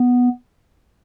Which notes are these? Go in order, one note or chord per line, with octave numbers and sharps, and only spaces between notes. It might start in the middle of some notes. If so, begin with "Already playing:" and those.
Already playing: B3